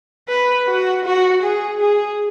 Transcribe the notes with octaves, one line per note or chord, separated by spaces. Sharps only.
B4
F#4
F#4
G#4
G#4